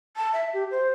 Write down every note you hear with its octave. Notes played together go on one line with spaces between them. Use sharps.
A5
E5
G4
C5